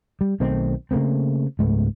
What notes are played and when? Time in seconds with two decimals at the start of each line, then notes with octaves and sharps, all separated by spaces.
0.21 G3
0.40 B1 D#3 A3 C4
0.91 C#3 A3 A#3 C4
1.59 C#2 G#2 A3 B3